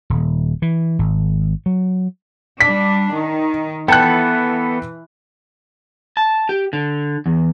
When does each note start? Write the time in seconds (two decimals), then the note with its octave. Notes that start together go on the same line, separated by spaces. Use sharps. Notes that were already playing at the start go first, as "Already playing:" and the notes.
0.10 D#1
0.62 E3
0.99 G#1
1.66 F#3
2.61 G3 D4 B6
3.12 D#3
3.88 E3 B3 A4 G5 A5 F#6
6.17 A5
6.49 G4
6.73 D3
7.26 E2